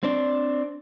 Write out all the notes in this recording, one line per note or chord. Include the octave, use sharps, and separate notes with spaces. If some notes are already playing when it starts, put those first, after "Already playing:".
C4 D4